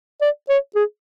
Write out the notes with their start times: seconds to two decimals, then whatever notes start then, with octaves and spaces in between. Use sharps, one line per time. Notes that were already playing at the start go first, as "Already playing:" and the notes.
0.21 D5
0.49 C#5
0.75 G#4